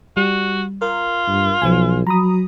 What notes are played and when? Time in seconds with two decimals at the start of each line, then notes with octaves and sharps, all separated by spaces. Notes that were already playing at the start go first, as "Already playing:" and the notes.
0.17 G3 F#4
0.82 F4 A#4
1.27 G2
1.62 B1 F3 G#5
2.07 F#3 A#5 B5 D#6